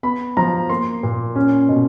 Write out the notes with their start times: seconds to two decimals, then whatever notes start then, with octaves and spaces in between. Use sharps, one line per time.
0.03 B3 B5
0.37 F3 A#5
0.69 A#3 C6
1.03 A#2
1.35 C#4
1.69 B2